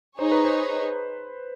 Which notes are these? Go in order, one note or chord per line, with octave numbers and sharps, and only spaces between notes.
D#4 G#4 C5 C#5
B4
C5